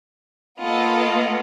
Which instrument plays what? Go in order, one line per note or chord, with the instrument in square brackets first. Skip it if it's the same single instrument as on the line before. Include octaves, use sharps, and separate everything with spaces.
[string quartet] A#3 F4 [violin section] B3 A4 D#5